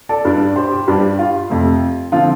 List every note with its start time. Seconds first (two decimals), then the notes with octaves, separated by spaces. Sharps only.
0.09 A4 D5
0.25 G2 G3 D4
0.56 G4 C5
0.72 G4
0.87 G2 G3 D4 G4
1.19 F4
1.50 F2 C3 A3
2.12 D3 F3 C4 F4